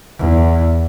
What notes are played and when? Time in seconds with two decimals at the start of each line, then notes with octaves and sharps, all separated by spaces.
0.18 E2